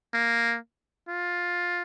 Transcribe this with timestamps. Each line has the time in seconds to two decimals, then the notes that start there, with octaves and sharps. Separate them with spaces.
0.14 A#3
1.09 F4